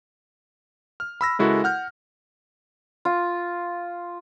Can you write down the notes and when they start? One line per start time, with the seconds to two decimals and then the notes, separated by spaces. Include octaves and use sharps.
1.00 F6
1.21 B5 E6 A#6
1.39 C#3 G#3 E4 F#4 A4 A#4
1.64 F#5 F6 G6
3.05 F4